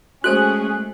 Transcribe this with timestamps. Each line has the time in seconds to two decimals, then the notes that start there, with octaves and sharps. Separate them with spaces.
0.24 G#3 A3 C#4 F#4 G#4 A4 C5 F#6